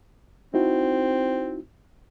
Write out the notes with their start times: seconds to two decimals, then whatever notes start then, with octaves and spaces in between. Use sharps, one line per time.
0.54 C4 D#4 E4 F#4